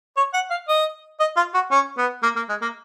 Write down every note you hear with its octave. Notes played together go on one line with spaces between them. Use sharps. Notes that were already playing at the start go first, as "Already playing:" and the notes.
C#5
F#5
F5
D#5
D#5
F4
F#4
C#4
B3
A#3
A#3
G#3
A#3